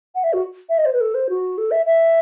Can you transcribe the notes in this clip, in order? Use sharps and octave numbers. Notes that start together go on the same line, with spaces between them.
F#5
E5
F#4
E5
D#5
C5
B4
A4
C5
F#4
A4
E5
E5